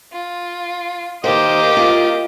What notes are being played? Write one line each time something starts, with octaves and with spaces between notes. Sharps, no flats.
F4
D#3 A#3 G4 C5 D#5 D6
F4